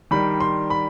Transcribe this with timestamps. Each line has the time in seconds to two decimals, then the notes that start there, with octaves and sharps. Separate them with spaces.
0.11 D#3 G3 D4 B5
0.40 C6
0.70 B5